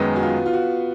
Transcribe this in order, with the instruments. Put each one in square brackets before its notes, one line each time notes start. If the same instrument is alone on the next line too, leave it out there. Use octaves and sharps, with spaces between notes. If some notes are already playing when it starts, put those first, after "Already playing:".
Already playing: [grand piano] F#2 D#3 G#3 [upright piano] B3 B4
[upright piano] F#4
F4
F4
F#4